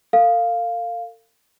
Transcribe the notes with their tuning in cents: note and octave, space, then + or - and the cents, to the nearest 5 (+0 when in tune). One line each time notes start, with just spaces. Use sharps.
A4 +45 F5 +0